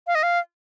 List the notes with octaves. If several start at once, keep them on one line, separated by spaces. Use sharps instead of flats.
F5
D#5
F5